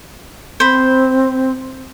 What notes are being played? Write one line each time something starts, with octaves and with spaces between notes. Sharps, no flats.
C4 C5 B5